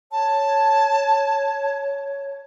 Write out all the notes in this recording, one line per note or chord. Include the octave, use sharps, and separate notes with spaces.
C#5 A5